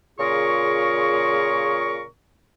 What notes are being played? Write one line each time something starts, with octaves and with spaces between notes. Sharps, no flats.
A#2 C#3 F4 G#4 A#4 C#6